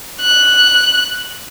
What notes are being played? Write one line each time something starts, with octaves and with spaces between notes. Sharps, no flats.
F#6